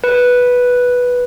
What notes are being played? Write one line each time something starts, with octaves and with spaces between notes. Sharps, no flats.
B4